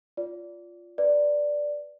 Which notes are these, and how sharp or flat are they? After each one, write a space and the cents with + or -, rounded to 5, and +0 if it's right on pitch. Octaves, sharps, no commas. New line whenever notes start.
F4 +0 D5 -20
B4 +0 D5 +0